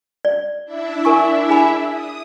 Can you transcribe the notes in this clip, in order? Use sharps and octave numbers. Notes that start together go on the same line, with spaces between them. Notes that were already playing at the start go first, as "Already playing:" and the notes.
D5
D4 E4 E5
A#4 G#5 C#6
G#4 G#5 B5
D#6